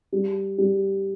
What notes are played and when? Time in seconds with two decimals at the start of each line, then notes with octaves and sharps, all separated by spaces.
0.12 G3
0.58 G3